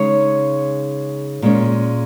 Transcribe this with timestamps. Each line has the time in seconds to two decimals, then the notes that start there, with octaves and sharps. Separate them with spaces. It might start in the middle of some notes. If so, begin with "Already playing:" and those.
Already playing: C#3 G#3 D#4 C#5
1.42 A#2 G#3 C#4